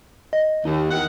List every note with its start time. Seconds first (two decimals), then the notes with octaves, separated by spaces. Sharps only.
0.33 D#5
0.65 D#2 D#4
0.91 E2 D#3 F#5